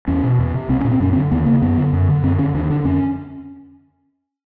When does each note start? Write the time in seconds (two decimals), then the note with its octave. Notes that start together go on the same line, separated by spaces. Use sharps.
0.08 E2 C#4
0.23 B2
0.39 E2
0.54 C3
0.69 C2 C4
0.81 A#2 C#4
0.91 C4
1.00 F#2 C#4
1.13 C4
1.16 D3
1.31 D#2 B3
1.46 C#3 A#3
1.62 F#2 B3
1.77 D3
1.93 F#2
2.08 D3
2.23 F#2 C4
2.38 D3 C#4
2.54 D#2 D4
2.70 D3 D4
2.85 F2 C#4